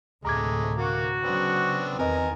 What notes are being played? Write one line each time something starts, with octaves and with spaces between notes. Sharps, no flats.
D2 A2 C3 G#3 A3 A#5 D6 G#6
A#3 F#4
C#3 F#3 B3 C4 D4
E2 D#3 C4 A#4 B4 D#5 G#5 A#5